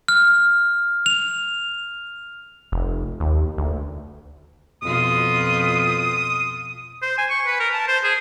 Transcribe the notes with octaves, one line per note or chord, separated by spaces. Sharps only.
F6
F7
F1
D#2
D2
F2 B2 F4 D#6
C5
G#5
C#6
B4
A#4
A5
C5
G#4